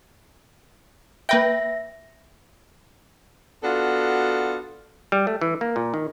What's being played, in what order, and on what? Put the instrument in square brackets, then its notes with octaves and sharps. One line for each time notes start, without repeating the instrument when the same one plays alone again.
[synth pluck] A#3 B4 G5 [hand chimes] E5 A#6
[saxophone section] B3 D4 F4 F#4 A4
[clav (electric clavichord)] G3
A3
E3
A#3
A#2
D#3